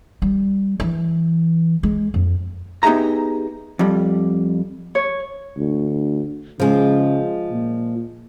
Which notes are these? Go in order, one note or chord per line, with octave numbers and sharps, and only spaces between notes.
G3
E3
G#3
F2
B3 D#4 G4 G#4 E5 A#5
F2 G3
C#5
D2
C#3 F3 G#3
A#2